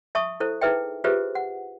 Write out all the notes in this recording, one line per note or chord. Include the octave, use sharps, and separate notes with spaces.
E5 A5 C#6 D#6
E4 A4 C5
D#4 E4 G#4 B4 E5 G5
F4 G4 G#4 B4 C5 E5
F#5